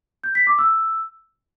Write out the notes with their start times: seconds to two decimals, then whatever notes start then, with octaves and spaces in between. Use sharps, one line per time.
0.24 G6
0.35 B6
0.47 D6
0.59 E6